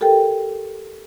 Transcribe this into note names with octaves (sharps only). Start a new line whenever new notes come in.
G4 A4 A#4 G5